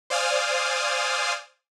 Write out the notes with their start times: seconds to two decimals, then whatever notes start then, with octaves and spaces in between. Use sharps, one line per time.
0.10 C5 D5 F5 G#5 D#6 F6